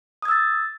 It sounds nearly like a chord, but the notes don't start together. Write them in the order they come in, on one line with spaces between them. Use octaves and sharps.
D#6 G#6 E6 A6